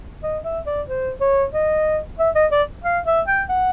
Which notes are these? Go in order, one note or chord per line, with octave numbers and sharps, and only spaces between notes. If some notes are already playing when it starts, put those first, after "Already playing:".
D#5
E5
D5
C5
C#5
D#5
E5
D#5
D5
F5
E5
G5
F#5